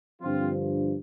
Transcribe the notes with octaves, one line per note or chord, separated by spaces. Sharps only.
G2 D3 F3 C4 F4